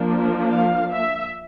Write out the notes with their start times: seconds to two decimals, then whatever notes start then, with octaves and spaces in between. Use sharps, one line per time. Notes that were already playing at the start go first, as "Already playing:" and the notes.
Already playing: F3 A#3 D4
0.49 F5
0.92 E5